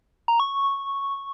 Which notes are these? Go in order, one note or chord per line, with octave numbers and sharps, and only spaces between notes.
A#5
C#6